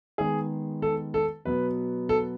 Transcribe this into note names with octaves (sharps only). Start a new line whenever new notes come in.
D#3 G#3 B3 G#4
A4
A4
B2 F#3 B3 B4
A4